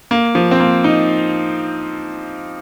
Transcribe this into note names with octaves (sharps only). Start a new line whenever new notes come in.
A#3
F3
C4
A#3
D#4